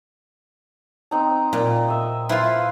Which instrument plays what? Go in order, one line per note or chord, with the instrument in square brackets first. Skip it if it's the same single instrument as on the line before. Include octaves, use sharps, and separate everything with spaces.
[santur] C4 D#4 A#5
[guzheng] A#2
[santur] D#5 E5
[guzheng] E4 F4 [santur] B4 C5 F5